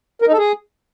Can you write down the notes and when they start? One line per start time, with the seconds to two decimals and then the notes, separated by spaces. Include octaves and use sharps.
0.22 A#4
0.27 D#4
0.32 A4
0.38 G#4